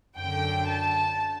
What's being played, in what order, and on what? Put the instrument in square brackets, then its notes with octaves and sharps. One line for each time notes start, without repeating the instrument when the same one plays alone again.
[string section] F#2 D3 G5
A5